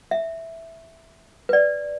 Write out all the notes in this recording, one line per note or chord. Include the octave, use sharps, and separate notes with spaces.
E5
B4
D5